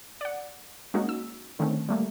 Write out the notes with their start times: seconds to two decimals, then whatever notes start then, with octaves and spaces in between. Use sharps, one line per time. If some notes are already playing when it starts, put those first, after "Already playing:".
0.21 D5 F#5
0.94 G#3 A#3 C#4 D#4 F#4
1.09 E6
1.59 D3 D#3 A3 C4 C#4
1.89 G3 A3 A#3